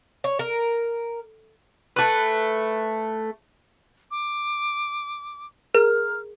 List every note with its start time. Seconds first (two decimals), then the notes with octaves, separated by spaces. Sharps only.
0.24 C#5
0.39 A#4
1.96 A3 B4
4.11 D6
5.75 G#4 A#4 F6